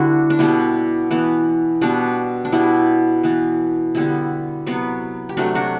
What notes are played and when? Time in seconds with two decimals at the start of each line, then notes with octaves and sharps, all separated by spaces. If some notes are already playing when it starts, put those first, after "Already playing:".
Already playing: D3 G3 B3 D4 E4 F#4
0.30 D4
0.39 B2 G3 B3 E4
1.11 E3 B3
1.81 B2 G3 B3 D4
2.45 D4
2.52 B2 G3 B3 E4
3.23 E3 B3
3.95 D3 G3 B3 E4
4.67 C3 F#3 B3
5.29 G4
5.37 C3 F#3 A3 D4 F#4
5.55 D4 F#4